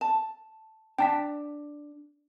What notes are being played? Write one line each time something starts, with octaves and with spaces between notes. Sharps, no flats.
A5
D4 G5 A5 B6